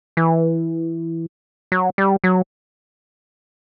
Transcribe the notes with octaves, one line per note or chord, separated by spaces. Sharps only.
E3
F#3
G3
F#3